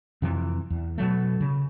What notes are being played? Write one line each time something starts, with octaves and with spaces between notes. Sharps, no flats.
F2 C3 E3
E2
B2 F#3 A3
C#3